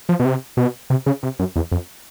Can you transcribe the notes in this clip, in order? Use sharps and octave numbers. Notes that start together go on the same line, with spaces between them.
F3
B2
C3
B2
C3
C#3
C3
F#2
E2
F2